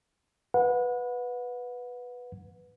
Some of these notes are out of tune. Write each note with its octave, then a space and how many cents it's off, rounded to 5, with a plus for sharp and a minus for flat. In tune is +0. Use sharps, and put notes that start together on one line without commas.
B4 +0 F#5 -30